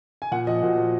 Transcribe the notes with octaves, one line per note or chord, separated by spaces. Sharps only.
G#5
A#2 F#5
F3 D#5
A#2 F#4
F3